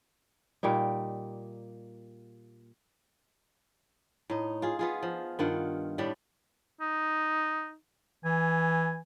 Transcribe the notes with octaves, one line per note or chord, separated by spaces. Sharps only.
A#2 G3 A#3 D#4
A2 D#4
F4 G#4
B3 F4 G#4
F3
G2 D#3 F4 F#5
A2 G3 A3 D4
D#4
E3 G#5